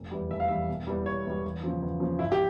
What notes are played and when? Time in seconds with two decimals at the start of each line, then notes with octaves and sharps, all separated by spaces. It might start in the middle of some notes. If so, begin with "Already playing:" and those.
Already playing: F1
0.11 E2 E3 G3
0.30 F1 E5
0.40 F5
0.48 E2 E3 G3 E5
0.69 E1
0.87 E2 E3 G3
1.06 E1 C#5
1.26 E2 E3 G3
1.44 E2
1.63 C#3 F3
1.82 E2
2.00 C#3 F3
2.19 G#1 E4
2.32 G4